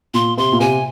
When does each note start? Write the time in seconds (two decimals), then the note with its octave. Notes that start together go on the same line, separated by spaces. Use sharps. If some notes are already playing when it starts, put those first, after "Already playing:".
0.14 A#2 C6
0.38 C3 C6
0.52 A#2
0.60 C3 G#5